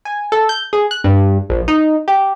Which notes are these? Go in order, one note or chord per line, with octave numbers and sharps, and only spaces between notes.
G#5
A4
G6
G#4
F#6
G2
A#1
D#4
G4